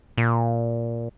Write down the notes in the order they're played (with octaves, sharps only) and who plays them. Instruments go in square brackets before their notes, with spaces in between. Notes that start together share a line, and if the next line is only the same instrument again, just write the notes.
[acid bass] A#2